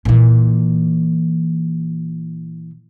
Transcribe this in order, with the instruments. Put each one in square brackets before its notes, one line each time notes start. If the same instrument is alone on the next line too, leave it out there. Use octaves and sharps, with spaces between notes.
[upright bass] A#2 E3